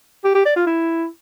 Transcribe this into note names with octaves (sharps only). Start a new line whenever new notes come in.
G4
G4
D5
F4
E4